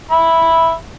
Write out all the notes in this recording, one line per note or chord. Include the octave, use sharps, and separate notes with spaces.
E5 B5